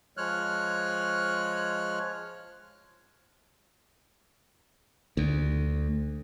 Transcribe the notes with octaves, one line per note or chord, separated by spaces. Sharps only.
F3 G#3 C#5 F6 F#6
D2